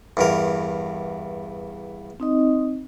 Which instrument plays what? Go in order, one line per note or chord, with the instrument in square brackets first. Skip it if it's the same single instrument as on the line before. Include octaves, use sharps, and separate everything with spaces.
[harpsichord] E2 G2 A#4
[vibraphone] C4 D#4 D#5